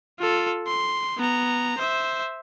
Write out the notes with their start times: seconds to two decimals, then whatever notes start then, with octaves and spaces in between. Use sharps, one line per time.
0.19 F4 A4
0.67 C6
1.18 B3 A#5
1.78 C5 E5